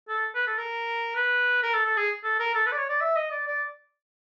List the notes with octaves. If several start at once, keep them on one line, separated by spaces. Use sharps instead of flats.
A4
B4
A4
A#4
B4
A#4
A4
A4
G#4
A4
A#4
A4
B4
D5
C#5
D5
E5
D#5
D5
D5